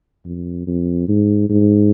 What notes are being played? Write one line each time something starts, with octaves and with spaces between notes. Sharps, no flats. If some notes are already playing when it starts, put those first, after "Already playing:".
F2
F2
G#2
G#2